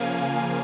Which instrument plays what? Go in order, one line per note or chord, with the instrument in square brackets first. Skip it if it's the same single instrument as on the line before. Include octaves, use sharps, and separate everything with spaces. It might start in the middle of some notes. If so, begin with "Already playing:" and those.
Already playing: [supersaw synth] C#3 F3 A#3 F5 G#5